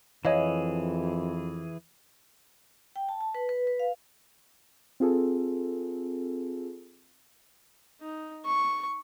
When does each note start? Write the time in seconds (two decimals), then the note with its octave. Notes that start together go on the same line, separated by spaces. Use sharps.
0.25 F2 E3 G#4 C#5 D#5 F5
2.96 G5
3.09 A5
3.21 A5
3.35 B4
3.49 B4
3.67 B4
3.79 F5
5.00 C4 F4 G#4 A4
8.01 D#4
8.46 C#6